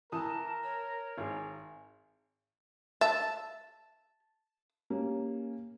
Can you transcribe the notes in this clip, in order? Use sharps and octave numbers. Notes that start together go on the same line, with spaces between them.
E3 A#4 A5 D#6
C#5
G#1 G#4
E5 A5
A#3 C#4 G4